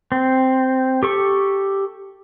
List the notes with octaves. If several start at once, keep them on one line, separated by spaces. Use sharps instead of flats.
C4
G4 A4 C#6